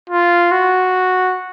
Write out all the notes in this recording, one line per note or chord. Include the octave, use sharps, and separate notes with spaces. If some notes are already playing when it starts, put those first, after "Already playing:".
F4
F#4